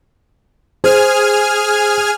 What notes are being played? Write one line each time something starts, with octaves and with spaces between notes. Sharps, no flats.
G#4 C5 G#5 F6